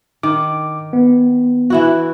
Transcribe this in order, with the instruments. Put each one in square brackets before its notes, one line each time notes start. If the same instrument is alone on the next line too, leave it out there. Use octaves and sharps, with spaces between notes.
[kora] D#3 [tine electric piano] D6
[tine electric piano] B3
[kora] E3 E4 F#4